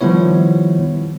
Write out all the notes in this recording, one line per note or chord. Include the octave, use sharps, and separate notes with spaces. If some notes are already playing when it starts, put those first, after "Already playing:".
D#3 F3 G3 B3 E4 C#5